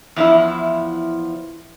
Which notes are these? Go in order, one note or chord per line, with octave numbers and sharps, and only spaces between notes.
E2 F3 E4